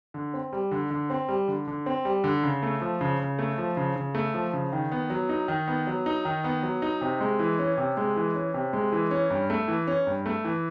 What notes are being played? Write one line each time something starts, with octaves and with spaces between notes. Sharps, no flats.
D3
C4
G3
D3
D3
C4
G3
D3
D3
C4
G3
D3
C#3
A3
F3
C#3
C#3
A3
F3
C#3
C#3
A3
F3
C#3
D#3
B3
F#3
D#4
D#3
B3
F#3
D#4
D#3
B3
F#3
D#4
C3
G#3
E3
C#4
C3
G#3
E3
C#4
C3
G#3
E3
C#4
G2
A3
E3
C#4
G2
A3
E3